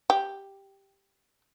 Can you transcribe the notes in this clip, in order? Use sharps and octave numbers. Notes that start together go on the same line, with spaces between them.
G4